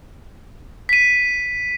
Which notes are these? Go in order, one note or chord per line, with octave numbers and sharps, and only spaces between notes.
B6 D#7